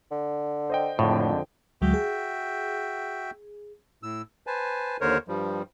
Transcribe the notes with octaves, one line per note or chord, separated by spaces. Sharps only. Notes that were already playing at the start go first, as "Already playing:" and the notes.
D3
C5 D#5 G5
G#1 F2 A2 D3
D2 F#3 G#3 F#4 E5 G5
G#4
A2 E6
B4 C5 G#5 A5
D#2 D3 A#4 C5 C#5
G2 F3 G3